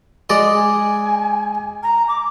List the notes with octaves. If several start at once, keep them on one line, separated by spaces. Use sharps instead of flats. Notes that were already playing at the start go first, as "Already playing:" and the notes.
G#3 D5 D#5
G#5
A#5
D6